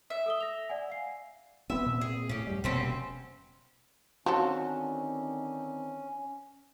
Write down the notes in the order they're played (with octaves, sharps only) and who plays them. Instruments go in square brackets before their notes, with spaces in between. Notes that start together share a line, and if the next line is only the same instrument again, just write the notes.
[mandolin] E5
[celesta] A4 D#6 G7
A#6 F7
D5 F#5 G#5
F5 C7
[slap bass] B3 C4 [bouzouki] E5
[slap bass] A#2 C4
[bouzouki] G#4
[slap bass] A2 [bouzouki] C#4 G4
[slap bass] F#2 G3
[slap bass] F1 B2 A#3 [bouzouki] G3 C4 C#4
[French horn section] D3 D#3 C4 [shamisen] F3 A4 [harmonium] C#4 [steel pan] F#4